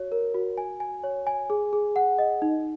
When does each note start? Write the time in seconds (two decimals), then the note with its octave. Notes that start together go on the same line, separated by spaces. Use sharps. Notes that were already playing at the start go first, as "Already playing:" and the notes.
Already playing: F#4 C#5
0.12 A#4
0.35 F#4
0.58 G#5
0.80 G#5
1.04 C#5
1.27 G#5
1.50 G#4
1.73 G#4
1.96 F#5
2.19 D#5
2.42 D#4